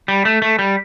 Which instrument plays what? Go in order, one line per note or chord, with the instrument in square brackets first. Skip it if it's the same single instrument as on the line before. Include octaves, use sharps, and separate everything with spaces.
[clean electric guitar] G3
A3
A3
G3